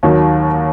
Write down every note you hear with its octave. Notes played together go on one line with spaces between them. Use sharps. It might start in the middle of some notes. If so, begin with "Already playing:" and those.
D#2 D#3 F#3